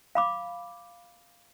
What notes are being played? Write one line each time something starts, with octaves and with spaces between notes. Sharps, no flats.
F5 B5 D6